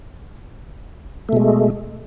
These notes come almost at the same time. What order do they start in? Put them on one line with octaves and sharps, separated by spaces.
A3 B2 G#3